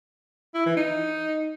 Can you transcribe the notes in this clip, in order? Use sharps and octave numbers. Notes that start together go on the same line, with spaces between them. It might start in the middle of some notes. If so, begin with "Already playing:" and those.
E4
E3
D#4